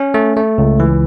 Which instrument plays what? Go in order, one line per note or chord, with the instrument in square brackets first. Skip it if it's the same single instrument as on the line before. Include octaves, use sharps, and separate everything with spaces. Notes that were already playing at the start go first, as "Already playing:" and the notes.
Already playing: [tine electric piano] C#4
A3
A3
C#2
E3